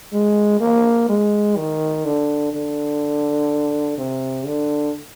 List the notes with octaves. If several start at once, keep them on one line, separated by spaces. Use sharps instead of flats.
G#3
A#3
G#3
D#3
D3
D3
C3
D3